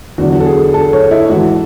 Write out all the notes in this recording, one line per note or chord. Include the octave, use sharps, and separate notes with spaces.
E2 D3 F#3 F#4
F#4
A4
G#4
A4
C#5
E4
G#2 E3 F#4